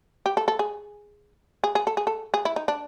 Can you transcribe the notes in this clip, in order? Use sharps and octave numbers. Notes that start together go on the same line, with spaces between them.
G4
A4
A4
G#4
G#4
G#4
A4
G#4
A4
G#4
E4
D#4
D4